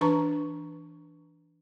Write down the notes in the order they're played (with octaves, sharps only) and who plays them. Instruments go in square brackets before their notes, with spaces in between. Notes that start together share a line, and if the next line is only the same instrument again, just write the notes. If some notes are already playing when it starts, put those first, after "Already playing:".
[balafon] E3 D4 B4 A5 A#5 C#6